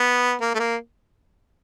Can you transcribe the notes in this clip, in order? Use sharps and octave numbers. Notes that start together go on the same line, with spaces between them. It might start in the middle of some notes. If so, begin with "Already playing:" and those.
Already playing: B3
A#3
A3
A#3